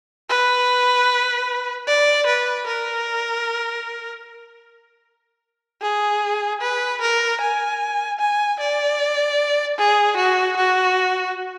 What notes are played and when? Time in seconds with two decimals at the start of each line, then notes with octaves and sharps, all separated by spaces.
0.30 B4
1.88 D5
2.27 B4
2.67 A#4
5.82 G#4
6.61 B4
7.02 A#4
7.41 G#5
8.19 G#5
8.60 D5
9.78 G#4
10.17 F#4
10.57 F#4